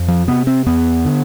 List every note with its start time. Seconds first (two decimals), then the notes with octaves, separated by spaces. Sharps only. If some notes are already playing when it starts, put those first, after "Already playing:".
Already playing: F2
0.08 F3
0.28 C3 B3
0.47 C4
0.66 E2 B3
1.05 D3